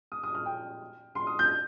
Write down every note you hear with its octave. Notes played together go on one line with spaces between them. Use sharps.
D#6
D#6
F6
G5
C6
D#6
G6